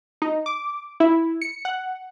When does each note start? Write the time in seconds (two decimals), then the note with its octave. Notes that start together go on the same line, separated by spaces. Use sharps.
0.22 D#4
0.46 D6
1.00 E4
1.42 C#7
1.65 F#5